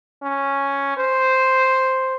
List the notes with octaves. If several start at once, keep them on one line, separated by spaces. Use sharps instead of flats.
C#4
C5